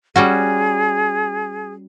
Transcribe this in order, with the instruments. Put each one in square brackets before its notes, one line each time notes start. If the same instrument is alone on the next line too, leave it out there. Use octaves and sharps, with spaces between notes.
[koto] G3 C#4 F#4 [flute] G#4